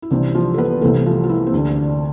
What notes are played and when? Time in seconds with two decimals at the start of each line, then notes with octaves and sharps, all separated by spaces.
0.02 E4
0.10 C2 C3 E3 D4
0.35 F3 F4
0.54 A4
0.58 B3 B4
0.81 C2 C3 E3 A3 A4
1.06 F3 F4
1.24 F4
1.29 E3 E4
1.47 C4
1.54 D2 D3 D4
1.76 D4